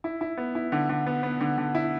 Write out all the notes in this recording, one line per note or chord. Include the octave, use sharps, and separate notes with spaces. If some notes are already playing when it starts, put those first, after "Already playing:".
E4
E4
B3
E4
D3
D3
B3
B3
D3
D3
E4